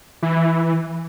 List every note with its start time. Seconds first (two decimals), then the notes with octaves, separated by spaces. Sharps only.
0.23 E3